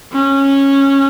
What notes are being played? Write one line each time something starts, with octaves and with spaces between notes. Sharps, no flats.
C#4